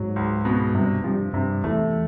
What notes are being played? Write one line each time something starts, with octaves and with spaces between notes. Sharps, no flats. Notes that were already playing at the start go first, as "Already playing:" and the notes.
Already playing: G#2 F#3
C#2
B2
G2 C3
G2 F3
G2 C3
E2 A3